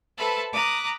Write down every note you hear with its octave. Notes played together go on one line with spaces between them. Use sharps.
A4 B4 C5 E5 A5 B5
A#5 B5 D6 D#6 F#6